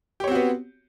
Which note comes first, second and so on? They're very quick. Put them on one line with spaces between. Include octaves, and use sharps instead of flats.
G4 C#5 C4 F#4 B3